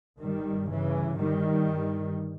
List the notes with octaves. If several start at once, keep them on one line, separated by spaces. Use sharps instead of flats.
G1 G2 D#3 G3
C#3 E3
D#3 G3